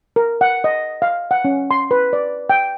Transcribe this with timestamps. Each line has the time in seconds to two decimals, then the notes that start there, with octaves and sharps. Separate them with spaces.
0.16 A#4
0.41 F#5
0.64 D#5
1.02 F5
1.31 F#5
1.45 C#4
1.71 C6
1.91 B4
2.13 D5
2.50 G5